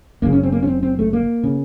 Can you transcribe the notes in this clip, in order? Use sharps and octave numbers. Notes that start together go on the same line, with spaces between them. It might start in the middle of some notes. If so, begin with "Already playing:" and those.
F#1 F#2 C#3 A#3
C#4
C4
A#3
C#4
C4
C4
A3
A#3
C#3